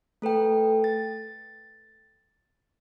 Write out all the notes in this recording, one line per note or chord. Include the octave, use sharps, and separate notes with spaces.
A3 A4 B4 G5
A6